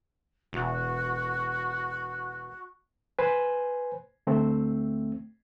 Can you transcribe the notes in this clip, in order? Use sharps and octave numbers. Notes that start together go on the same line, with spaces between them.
E1 F#4
B4 C5 G#5
D2 A3 C4